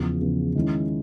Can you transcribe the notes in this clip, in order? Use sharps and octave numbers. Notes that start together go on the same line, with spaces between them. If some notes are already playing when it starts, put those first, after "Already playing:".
Already playing: E2 C#3 F3
E2 C#3 F3
D#3 G#3 C#4 E4